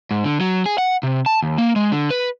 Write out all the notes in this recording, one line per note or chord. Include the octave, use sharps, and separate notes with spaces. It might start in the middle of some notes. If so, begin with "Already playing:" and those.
G#2
D3
F#3
G#4
F#5
C3
A5
D#2
A#3
G#3
D3
B4